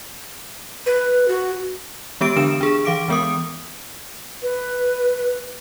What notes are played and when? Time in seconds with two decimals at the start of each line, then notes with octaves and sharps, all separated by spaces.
0.86 B4
1.28 F#4
2.21 E3 G#3 B3 G4 E6 D7
2.37 D3 D4 A#4 E7
2.61 D4 G#4
2.85 E3 F5 D6 D7
3.08 E3 G#3 B3 A#4 D#6
4.43 B4